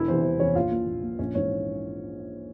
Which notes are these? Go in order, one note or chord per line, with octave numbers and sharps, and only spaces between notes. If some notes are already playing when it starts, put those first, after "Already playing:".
Already playing: E1 E4 E5
E2 C3 E3 C5
E1 C5
E2 C3 E3 C#4 C#5
A#1 F4 F5
A#2
A#1
A#2
A#1 C#4 C#5
G#2 E3 C#4 C#5